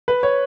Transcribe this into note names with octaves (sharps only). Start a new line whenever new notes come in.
B4
C#5